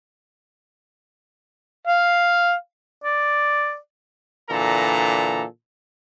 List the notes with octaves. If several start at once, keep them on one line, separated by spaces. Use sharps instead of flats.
F5
D5
A#2 D3 E3 A4 A#5